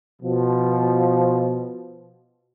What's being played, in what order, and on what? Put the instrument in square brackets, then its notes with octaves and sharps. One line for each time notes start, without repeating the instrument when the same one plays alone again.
[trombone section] B2 F3